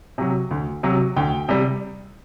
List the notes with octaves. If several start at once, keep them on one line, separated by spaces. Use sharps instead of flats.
C3 F#3
D2
C3 F#3
D2 G5
C3 G3